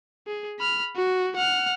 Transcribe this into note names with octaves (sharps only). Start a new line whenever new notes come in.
G#4
B5 F6
F#4
F#5 F6